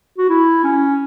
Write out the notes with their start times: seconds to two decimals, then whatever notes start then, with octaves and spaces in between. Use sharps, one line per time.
0.18 F#4
0.29 E4
0.64 C#4